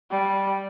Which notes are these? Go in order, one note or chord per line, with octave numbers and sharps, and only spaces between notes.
G3